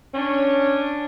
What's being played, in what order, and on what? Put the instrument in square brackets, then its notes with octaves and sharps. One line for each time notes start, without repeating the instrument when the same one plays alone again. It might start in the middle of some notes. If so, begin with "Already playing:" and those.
[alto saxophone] C#4 [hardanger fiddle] D4 C#5